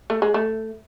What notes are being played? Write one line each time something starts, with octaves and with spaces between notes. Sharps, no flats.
A3
G#3
A3